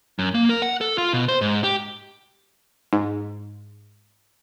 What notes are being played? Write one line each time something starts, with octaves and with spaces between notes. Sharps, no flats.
F#2
A#3
A#4
F#5
A4
F4
B2
C5
G#2
G4
G#2